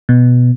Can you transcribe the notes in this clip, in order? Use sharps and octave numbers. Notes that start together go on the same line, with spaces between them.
B2